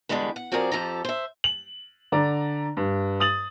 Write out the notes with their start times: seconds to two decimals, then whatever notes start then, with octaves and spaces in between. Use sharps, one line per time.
0.09 E2 D3 F3 G3 G#3 B4
0.36 F#5
0.52 F3 C4 F#4 G#4 A#4 D5
0.72 F2 F3 G4 A4 A#5
1.05 C5 E5
1.44 F#7
2.12 D3 D5 A#5
2.77 G2
3.20 D#6 A6 F#7